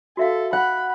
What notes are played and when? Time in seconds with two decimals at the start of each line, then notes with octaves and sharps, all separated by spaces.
0.17 F#4 A4 E5 F5
0.53 F#5 B5